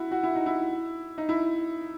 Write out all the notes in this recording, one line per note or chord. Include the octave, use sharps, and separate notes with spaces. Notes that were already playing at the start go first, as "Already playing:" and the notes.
Already playing: E4 F#4
F#4
E4
D#4
E4
D#4
E4